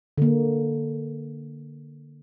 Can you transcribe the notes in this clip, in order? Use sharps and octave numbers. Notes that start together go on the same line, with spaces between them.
D3 A#3